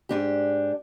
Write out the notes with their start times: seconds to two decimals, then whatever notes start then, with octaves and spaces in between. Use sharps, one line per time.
0.09 G#2 D4 G4